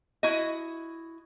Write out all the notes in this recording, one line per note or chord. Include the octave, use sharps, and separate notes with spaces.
E4 F#4 D#5